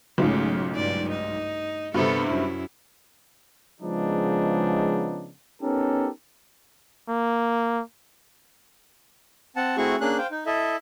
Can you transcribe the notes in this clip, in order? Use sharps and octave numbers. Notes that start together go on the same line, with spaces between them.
B1 G#2 C#3 A3 F4
G2 D5
D#4
G2 C3 B3 A4 C5
F#2 E4
C#3 F3 G#3 B3 D4 D#4
B3 C#4 D#4 G4 A4 A#4
A#3
C4 F#5 A5
A3 C4 E4 F#4 G#4 C#6
A#3 C#4 D4 G#4 F#6
C5 F5 G5
D#4
E4 A4 D#5 E5